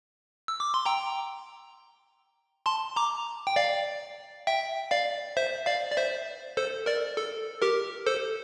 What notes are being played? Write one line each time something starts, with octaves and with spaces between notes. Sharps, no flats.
E6
D6
C6
G5 A#5
A5 C6
A#5 D6
G5
D5 F5
E5 G5
D5 F5
C5 E5
D5 F5
D5
C5 E5
A4 C5
A#4 D5
A4
G4 A#4
A4 C5